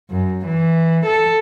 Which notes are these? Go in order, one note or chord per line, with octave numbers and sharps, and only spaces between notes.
F#2
E3
A4